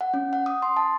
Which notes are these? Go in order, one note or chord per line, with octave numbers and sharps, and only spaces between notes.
F#5
C#4
F#5
D#6
C6
A5